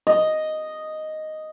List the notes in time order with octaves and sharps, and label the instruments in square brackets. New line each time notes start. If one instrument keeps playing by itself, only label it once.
[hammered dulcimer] D#5